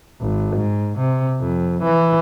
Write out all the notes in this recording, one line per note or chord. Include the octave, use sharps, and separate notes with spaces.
G#1
G#2
C3
F2
E3